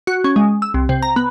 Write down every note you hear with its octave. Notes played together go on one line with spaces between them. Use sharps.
F#4
C#4
G#3
E6
C2
C3
A#5
B3